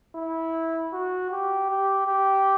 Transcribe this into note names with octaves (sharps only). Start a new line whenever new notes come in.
E4
F#4
G4
G4
G4